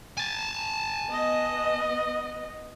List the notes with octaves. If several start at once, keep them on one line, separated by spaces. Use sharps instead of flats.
G#5 A5
B3 D#5